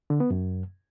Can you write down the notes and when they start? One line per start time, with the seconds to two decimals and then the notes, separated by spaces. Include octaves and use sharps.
0.10 D3
0.20 B3
0.30 F#2